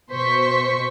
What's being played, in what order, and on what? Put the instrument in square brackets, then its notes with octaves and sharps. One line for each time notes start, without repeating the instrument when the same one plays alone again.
[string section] B2 C5 C6 C#6 B6